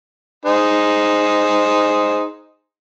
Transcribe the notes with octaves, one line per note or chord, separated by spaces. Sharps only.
D#4 G#4 C5